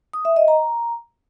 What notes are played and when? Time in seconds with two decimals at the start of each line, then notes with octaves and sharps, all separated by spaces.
0.13 D#6
0.25 E5
0.36 D#5
0.48 A#5